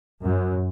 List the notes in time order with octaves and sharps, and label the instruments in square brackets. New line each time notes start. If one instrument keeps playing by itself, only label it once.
[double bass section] F#2